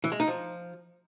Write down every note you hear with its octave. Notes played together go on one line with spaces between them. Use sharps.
E3
G#3
D#4
F3